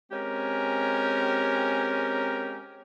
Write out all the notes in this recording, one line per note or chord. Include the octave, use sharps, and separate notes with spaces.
G#3 C4 C#4 G4 A#4